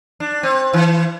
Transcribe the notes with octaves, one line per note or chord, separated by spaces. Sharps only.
D4
C4
E3